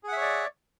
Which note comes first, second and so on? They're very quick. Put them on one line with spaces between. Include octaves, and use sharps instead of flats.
G#4 F#5 E5 C#5 D5